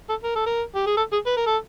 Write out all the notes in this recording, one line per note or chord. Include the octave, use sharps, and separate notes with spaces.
A4
A#4
A4
A#4
G4
G#4
A4
G#4
B4
A#4
A4